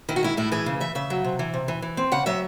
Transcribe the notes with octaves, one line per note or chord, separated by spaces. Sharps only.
D#3 E4
F#4
G#3 E4
A2 E4
E3 G#4
C#3
E3 E5
C#3 E5
F#3
C3
E3
C3
E3
E3
C4
C#3 F#5
F#3 E5